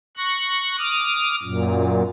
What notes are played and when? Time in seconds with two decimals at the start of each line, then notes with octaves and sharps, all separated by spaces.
0.17 C#6 F#6 A#6
0.78 D6 D#6 F6
1.43 F#2 A#2